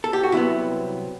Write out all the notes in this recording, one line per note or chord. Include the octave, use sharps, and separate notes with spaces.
A4
G4
F#4
C2 C3 F#3 B3 E4